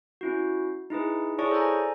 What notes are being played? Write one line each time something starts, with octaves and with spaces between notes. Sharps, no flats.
C#4 E4 F#4
D#4 E4 G#4 B4
E4 G#4 C#5 D5 A5 C#6
A4 C5 D5 G#5 A#5